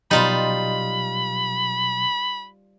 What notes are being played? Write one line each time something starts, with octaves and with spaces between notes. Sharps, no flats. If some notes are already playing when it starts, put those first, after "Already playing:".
B2 F#3 G3 D#4 F4 C5 B5